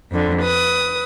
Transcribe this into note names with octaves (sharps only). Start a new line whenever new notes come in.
F2 D3
B4 D#6